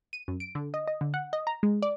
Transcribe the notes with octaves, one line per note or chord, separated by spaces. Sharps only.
D#7
F#2
D7
D3
D#5
D#5
D3
F#5
D#5
A#5
G#3
D5